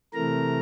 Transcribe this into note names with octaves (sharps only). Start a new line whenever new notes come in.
C3 E3 A3 A#4 A#5